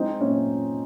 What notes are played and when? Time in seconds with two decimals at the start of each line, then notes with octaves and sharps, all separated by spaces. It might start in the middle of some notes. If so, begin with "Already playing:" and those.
Already playing: G#3 C4 D#4
0.21 A#2 C#4